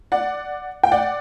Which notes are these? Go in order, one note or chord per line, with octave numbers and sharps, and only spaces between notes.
D5 F#5
G5
D5 F#5